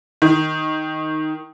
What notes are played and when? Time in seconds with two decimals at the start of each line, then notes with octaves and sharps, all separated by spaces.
0.22 D#3